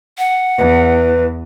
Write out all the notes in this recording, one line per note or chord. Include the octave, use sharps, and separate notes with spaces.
F#5
E2 B4